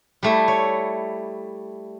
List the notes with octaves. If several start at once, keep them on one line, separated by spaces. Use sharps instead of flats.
G3 A3 E4
C#5